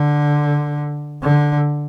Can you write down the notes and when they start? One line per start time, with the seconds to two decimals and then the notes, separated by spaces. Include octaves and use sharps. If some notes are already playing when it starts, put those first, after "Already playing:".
Already playing: D3
1.22 D3